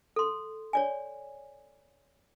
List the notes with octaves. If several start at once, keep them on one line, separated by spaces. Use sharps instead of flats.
A4 C6
C#5 D5 G#5